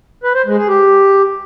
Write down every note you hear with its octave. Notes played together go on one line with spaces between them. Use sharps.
B4
C5
G#3
G#4
G4